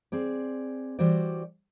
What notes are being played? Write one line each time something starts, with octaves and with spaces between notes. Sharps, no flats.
C4 G#4 D5
E3 G3 F#4 C5 D5